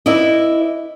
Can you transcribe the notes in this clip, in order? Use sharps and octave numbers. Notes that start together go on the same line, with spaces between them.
E4 B4 D5 D#5